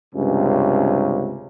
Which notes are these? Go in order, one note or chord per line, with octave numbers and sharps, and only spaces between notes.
C#2 G2 C3 C#4